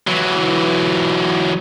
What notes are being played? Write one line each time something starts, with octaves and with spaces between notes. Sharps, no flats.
E3 F#3